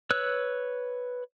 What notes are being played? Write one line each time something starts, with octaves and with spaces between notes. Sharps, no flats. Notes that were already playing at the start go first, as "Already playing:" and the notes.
B4 C#5 E6 F#6